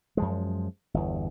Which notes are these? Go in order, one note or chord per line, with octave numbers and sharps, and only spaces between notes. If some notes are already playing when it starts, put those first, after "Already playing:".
F#2 F3 G#3
G1 E2